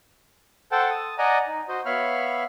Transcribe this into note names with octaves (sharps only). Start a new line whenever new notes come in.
A4 C5 F#5 G5 A5
A5 D#6
D5 D#5 F#5 G#5 A#5
D#4
F#4 C5 D#5
B3 C#5 E5 F5 B5 F6